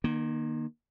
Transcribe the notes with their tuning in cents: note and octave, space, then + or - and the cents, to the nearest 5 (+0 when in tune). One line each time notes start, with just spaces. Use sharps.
D#3 -30 A#3 +25